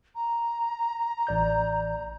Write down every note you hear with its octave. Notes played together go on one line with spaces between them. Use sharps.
A#5
A1 D5 G6